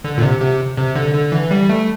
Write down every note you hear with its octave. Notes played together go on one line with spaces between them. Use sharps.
D3
A#2
C3
C3
C3
D3
D3
E3
G3
A3